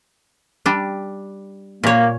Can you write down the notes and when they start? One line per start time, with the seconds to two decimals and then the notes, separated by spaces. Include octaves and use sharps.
0.66 G3 D4
1.84 A#2 A#3 C#5